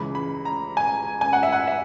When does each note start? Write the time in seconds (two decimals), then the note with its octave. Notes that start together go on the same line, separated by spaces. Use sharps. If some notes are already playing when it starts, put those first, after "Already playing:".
Already playing: C#2 C#3 E3 G#3 B5
0.15 B5
0.45 A#5
0.77 G#5
1.21 G#5
1.33 F#5
1.43 E5
1.52 F#5
1.68 E5